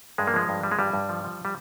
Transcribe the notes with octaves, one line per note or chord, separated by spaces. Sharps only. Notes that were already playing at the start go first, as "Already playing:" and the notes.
G2 G#3
A#3
F3 G#3
G2
F3 G3
G#3
G2 G3
G2
F3
F3
G3